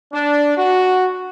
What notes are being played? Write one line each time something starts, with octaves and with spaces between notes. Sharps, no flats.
D4
F#4